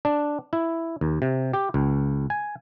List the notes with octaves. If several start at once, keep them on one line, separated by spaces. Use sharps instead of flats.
D4
E4
D#2
C3
G4
C#2
G#5